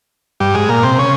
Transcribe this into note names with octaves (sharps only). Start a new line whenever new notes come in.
G2 G3
G#2 G#3
A#2 A#3
C3 C4
C#3 C#4